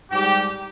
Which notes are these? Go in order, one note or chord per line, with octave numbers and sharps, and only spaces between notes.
G#2 G3 G4